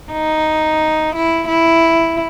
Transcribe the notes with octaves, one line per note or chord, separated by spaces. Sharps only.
D#4
E4
E4